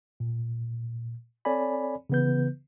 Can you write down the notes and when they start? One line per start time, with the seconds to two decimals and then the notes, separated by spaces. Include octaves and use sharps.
0.20 A#2
1.45 C4 A4 C#5 D5 G#5 B5
2.10 C#3 E3 B3 B4 G6